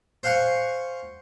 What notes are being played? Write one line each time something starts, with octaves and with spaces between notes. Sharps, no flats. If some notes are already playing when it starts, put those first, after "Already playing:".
C5 F5 F#5 G#5 C#6